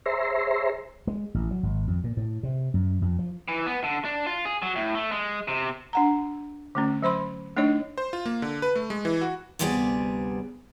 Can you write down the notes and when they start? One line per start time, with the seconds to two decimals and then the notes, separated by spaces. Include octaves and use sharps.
0.06 G#4 C5 C#5 E5 A#5 C6
1.07 G#3
1.34 A1
1.51 F#3
1.63 G#1
1.88 F2
2.04 A#2
2.17 A2
2.43 C3
2.74 F#2
3.02 F2
3.19 F3
3.48 E3
3.67 B3
3.84 D3
4.05 D4
4.27 F4
4.45 G#4
4.62 F#3
4.76 A2
4.95 A3
5.12 G#3
5.48 C3
5.93 D4 F#5 A#5
6.75 D3 A3 C#4
7.02 F#3 C5 B5 C6
7.57 A3 D4 D#4 C#5 D#5
7.98 C5
8.13 F4
8.26 A#3
8.42 D3
8.62 B4
8.75 A3
8.90 G#3
9.05 E3
9.21 F#4
9.59 D2 C3 G3 B3 G#4 D5